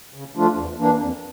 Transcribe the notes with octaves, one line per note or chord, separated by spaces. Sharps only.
C#3
F3 A3 D4 F4
E2
E3 A#3 D4
F2